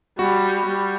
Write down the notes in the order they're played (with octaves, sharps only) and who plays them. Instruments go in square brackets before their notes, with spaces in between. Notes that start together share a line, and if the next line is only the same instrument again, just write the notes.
[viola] G3 [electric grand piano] F#4
[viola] G3